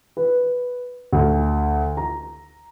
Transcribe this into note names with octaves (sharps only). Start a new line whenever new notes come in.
B4
D2
A#5